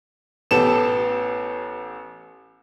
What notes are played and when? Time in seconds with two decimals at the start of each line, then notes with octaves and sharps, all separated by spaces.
0.51 A1 B3 G4 A4 E7